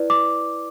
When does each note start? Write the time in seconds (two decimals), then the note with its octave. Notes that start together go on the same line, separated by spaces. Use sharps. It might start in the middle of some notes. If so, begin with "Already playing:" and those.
Already playing: E4 B4 D5
0.10 D6